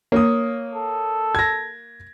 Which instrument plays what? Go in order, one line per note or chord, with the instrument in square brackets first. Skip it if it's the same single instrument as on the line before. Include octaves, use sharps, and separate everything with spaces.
[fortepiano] A#3 [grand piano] C#5 D#6
[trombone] A4
[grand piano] G#6 A#6